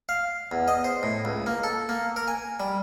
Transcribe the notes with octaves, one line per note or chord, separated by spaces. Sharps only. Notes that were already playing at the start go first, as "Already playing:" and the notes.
F5
E2
D#5
C5
A2
C#2
A#3
A4
A#3
A#4
G#5
G3